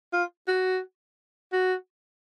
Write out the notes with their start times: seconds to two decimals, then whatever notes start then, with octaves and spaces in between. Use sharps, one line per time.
0.13 F4
0.47 F#4
1.53 F#4